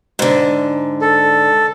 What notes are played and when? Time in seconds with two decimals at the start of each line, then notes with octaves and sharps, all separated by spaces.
0.19 G#2 D3
1.02 A4